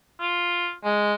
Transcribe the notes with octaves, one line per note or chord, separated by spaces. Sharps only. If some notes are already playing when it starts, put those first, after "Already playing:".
F4
G#3